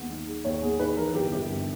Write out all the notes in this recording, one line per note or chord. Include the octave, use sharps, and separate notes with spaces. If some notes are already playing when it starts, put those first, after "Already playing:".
Already playing: D#2 G#3 B3
D#3
G#3
D#2 C#5
B3 G#4
D#3 B4
E3 A#4
G1 G4
G1 G4
G2